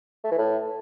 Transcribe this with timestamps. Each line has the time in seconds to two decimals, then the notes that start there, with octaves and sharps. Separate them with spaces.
0.24 A3
0.31 E3
0.38 A2